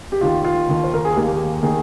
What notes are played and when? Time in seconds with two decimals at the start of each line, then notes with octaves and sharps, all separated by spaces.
0.12 G4
0.21 D#2 D#3 A#3 F4
0.45 F4
0.69 D#2 D#3 A#3
0.84 C5
0.94 A#4
1.05 G#4
1.15 D#2 D#3 A#3 G4
1.63 D#3 A#3 G#4